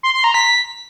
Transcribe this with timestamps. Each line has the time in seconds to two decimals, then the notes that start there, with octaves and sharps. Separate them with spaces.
0.03 C6
0.14 C6
0.24 A#5
0.34 B6